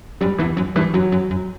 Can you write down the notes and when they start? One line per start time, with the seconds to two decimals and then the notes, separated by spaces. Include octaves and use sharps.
0.21 F#2 G3
0.38 E2 E3
0.57 F#2
0.76 G2 E3
0.94 F#2 F#3
1.12 F#2
1.31 F#2